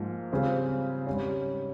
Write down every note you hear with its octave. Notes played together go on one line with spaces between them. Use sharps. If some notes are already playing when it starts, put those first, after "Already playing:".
Already playing: G#2 F3 A#3
C#3 G3 C4 F4 G#4
G#2 G3 C#4